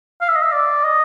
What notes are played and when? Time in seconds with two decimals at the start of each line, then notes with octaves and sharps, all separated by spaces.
0.21 F5
0.29 E5
0.36 D#5
0.43 E5
0.52 D5
0.84 D#5